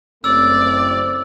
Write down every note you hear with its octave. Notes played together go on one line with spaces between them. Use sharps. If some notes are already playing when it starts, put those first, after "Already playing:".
F#1 A3 C4 D5 E6